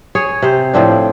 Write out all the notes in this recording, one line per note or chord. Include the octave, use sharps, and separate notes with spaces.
G#4 C#5
C3 C5
A2 F3 C4 D4